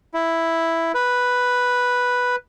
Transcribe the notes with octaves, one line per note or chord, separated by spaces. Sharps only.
E4
B4